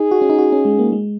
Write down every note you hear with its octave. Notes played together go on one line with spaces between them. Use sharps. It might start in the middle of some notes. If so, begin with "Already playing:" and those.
Already playing: D#4 G#4
F#4
C#4
D#4
F#4
C#4
G#3
A#3
G#3